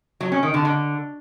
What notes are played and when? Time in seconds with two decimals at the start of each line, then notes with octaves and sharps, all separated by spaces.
0.21 F#3
0.32 C#4
0.43 D#3
0.54 D3
0.65 D3